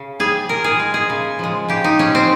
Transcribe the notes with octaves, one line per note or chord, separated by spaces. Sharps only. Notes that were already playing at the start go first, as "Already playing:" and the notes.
Already playing: C#3
G3 G#4
A#2 A#4
G#4
G#3
G#4
C#3
F3 G#3
C#3 G4
D#4
F3 G#3 C#4
C4